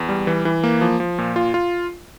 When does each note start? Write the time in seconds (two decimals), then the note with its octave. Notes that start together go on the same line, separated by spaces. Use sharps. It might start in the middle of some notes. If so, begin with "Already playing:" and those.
Already playing: E2
0.09 G3
0.27 E3
0.45 E3
0.64 A#3
0.81 F3
1.00 F3
1.19 A#2
1.36 F4
1.54 F4